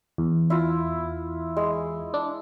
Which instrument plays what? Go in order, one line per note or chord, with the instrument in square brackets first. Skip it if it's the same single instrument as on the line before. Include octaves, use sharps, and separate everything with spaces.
[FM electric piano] E2
[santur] E4 F4
G#3
[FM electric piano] D4